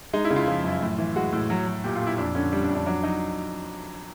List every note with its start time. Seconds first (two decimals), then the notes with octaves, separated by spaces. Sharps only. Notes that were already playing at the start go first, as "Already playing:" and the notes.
0.13 G#3 D#4
0.25 E4
0.30 C#3
0.36 F4
0.47 F3
0.64 F#2
0.82 A2
0.98 E3
1.16 G#3 F#4
1.32 A2
1.50 F#3
1.67 F#3
1.84 A#2 G4
1.95 F4
2.02 A#2 E4
2.18 F2 D4
2.35 D3 C#4
2.52 G3 D4
2.64 D4
2.69 F2
2.75 D4
2.86 F#3 D4
3.03 F#3 D#4